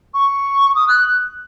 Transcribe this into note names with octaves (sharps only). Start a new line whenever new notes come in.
C#6
D#6
F#6